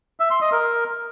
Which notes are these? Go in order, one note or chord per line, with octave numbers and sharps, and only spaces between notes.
E5
C6
D#5
A#4